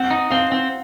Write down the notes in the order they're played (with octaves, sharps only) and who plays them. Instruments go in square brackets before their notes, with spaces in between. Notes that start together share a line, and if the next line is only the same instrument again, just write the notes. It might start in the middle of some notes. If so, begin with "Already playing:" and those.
Already playing: [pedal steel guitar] C4 [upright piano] F#5
[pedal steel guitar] D#4
[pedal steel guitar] C4 [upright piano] F5
[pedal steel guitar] C4